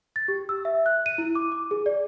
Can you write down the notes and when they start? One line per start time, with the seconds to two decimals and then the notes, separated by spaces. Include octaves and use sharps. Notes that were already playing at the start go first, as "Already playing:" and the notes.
0.16 A6
0.28 G4
0.49 E6
0.65 E5
0.86 F#6
1.06 D#7
1.18 E4
1.35 D6
1.52 D6
1.71 G#4
1.86 D5